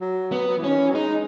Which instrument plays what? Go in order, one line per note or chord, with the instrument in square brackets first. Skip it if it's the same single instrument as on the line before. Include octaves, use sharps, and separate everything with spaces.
[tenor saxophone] F#3
[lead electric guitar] B3
[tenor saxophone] F#3
E3
[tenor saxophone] D#3 [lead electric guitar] C#4
[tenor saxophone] E3
F#3
[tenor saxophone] G#3 [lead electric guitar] D#4